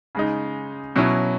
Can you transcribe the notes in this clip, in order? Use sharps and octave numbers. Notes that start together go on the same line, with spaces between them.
C#3 G#3 D#4
B2 F#3 C#4 E4